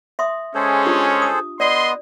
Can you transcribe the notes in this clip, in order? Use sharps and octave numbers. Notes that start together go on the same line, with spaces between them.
E5 C6 D#6
G#3 C#4 G#4 A4 C5
D4 F4 G4
D#6
B3 D5 D#5 C6